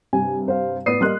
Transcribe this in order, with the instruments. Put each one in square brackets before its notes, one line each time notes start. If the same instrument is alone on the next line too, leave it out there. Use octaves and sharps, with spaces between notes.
[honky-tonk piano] G2 C3 [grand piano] G#5
[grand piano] C5 F5
[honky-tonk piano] A2 B3 D5 [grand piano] D#6 C7 D#7
[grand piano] G3 A#3 D#5 [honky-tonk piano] C6 F6 F#6